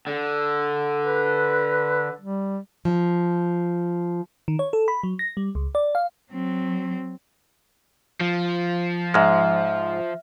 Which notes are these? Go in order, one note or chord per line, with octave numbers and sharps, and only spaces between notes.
D3
B4
G3
F3
D#3
C#5
A4
B5
F#3
A#6
G3
C#2
D5
F5
F#3 C4
F3
G#2 G#3 E5 F6